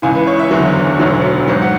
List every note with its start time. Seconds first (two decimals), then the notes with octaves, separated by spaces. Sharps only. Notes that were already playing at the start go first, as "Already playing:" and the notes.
0.02 C#2 C#3 E3 G#5
0.15 B4
0.27 C#5
0.39 E5
0.51 F#1 E2 D3 F#3 C#5
1.00 E1 D2 D3 F#3
1.48 G#1 G#2 F#3
1.62 F#5